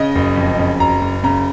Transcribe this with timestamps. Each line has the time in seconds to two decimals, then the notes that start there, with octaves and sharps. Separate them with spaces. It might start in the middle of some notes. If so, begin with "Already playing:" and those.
Already playing: C#3 D#5
0.15 F#1
0.36 F2
0.58 C#3
0.80 F#1 A#5
1.01 F#1
1.23 C#3 A#5